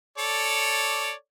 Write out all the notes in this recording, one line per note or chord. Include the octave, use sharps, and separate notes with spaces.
A4 C#5 D5